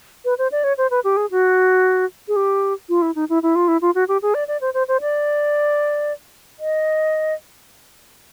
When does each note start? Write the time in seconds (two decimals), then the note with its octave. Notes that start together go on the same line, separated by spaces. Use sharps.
0.25 B4
0.38 C5
0.52 D5
0.64 C#5
0.78 C5
0.90 B4
1.04 G4
1.17 G#4
1.31 F#4
2.28 G#4
2.36 G4
2.89 F4
3.02 E4
3.15 D#4
3.29 E4
3.43 E4
3.55 F4
3.68 E4
3.81 F4
3.95 F#4
4.08 G4
4.22 G#4
4.34 D5
4.48 D5
4.61 C5
4.74 C5
4.88 C5
5.01 D5
6.59 D#5